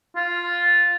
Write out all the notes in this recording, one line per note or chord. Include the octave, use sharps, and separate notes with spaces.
F4